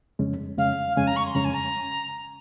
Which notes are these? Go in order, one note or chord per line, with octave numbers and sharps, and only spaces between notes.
F2 C#3 G#3 C#4
F2 C#3 G#3 C#4 F5
F2 C#3 G#3 C#4 G#5
A#5
C#6
C6
F2 C#3 G#3 C#4 A#5
G#5
A#5